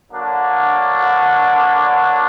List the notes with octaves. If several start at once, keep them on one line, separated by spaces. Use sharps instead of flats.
D3 F#3 A#3 D4